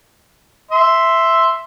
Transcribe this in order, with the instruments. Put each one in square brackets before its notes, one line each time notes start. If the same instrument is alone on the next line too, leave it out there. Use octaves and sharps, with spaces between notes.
[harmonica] E5 C6